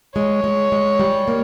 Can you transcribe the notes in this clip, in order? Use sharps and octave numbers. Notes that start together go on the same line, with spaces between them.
G#3 C#5
G#3
G#3
G3
A#3